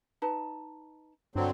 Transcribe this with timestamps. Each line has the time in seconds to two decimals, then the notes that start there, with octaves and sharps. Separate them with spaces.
0.22 D#4 B4 A5
1.36 G2 D3 F#3 C4